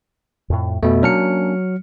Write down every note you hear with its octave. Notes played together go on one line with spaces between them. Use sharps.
F2 A2
F2 B2 A3
F#3 A#3 C#4 D4 F6 C#7